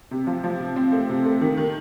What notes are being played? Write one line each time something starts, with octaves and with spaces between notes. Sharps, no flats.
C3
F3
F3
C3
C4
A3
C3
A3
D#3
D#3